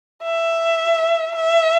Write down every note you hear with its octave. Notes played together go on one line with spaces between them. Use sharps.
E5
E5